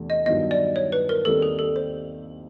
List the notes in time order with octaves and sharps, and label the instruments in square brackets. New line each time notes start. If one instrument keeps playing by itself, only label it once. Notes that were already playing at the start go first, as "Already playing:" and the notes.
Already playing: [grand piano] E2 C3 E3 A3 D4
[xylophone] D#5
[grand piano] G2 D#3 F#3 B3 E4 [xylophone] D#5
[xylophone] D5
C#5
B4
A#4
[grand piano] D#2 D#3 G3 C4 D#4 [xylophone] A4
[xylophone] G#4
A4
C5